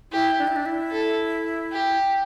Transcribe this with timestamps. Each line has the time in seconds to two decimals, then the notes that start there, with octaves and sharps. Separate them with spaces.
0.12 E4 G4
0.39 D4
0.47 E4
0.56 D4
0.66 E4
0.92 A4
1.72 G4